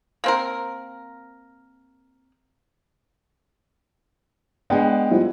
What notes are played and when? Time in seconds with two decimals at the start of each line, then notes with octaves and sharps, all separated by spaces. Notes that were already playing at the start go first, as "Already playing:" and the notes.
0.24 A#3 C4 A#4
4.70 G#3 B3 D4 F#5 G5
5.11 F3 G3 E4